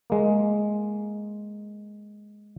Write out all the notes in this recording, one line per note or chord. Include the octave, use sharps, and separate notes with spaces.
G#3 A#3